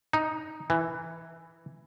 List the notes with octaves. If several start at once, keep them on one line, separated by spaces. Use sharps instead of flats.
D#4
E3